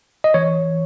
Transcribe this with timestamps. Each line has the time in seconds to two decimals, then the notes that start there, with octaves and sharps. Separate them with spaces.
0.24 D#5
0.34 E3 C#5